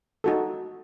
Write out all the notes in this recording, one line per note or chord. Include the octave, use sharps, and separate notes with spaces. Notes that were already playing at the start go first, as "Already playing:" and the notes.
D#4 F#4 A4